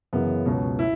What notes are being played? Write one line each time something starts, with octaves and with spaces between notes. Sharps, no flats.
F#2 C#3 E3 B3
C#2 B2 F#3 C#4
E4